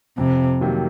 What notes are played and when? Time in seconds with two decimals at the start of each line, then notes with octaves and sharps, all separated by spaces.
0.17 F2 C3
0.61 C3 D#3 F#3 A#3